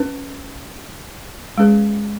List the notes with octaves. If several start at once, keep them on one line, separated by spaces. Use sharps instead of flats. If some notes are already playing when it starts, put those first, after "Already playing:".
Already playing: C#4 B4
G#3 C#4 G#4 B4